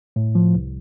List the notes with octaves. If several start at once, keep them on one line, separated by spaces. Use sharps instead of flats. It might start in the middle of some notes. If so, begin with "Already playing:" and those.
A2
F3
C2